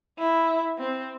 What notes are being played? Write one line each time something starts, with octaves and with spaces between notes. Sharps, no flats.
E4
C4